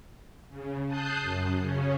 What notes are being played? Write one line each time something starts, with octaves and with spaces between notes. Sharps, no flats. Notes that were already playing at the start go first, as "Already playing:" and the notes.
C#3
A5 D#6 F#6 G6 C7
F#2
C#3 C#4